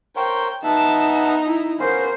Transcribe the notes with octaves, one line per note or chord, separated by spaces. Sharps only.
A#4 C5 C#5 G5
B3 D#4 E5 F#5 A5
E4
B3 C#4 F4 A#4 C5